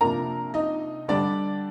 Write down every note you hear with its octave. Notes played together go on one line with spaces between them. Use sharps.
C3 F3 A#3 D4 A#4 A#5
D#4 D#5
D3 G3 D4 D5